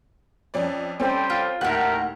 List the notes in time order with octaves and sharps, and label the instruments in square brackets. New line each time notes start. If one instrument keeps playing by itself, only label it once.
[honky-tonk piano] F2 C#4 D5
[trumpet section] G3 G5 C6 [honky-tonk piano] C4 C#4 A4
[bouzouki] F4
[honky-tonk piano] D#2 [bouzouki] A2 F#5 [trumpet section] A3 A#4